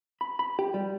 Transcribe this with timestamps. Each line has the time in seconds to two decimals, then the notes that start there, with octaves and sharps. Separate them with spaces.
0.21 B5
0.39 B5
0.59 G4
0.74 G3